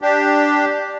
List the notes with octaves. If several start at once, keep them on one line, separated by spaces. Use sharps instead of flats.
D4 G4